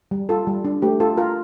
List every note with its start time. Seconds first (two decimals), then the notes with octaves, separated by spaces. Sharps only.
0.11 G3
0.29 F4 A4
0.47 G3
0.65 D4
0.82 A3 G4
1.00 F4 A4
1.17 F4 A#4